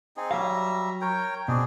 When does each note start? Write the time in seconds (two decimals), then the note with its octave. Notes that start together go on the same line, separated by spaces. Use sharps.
0.17 C4 D#4 G#4
0.31 F#3 G3 E5 F5 A#5
1.01 A#4 C#5 G5
1.48 B2 C4 D4 G#4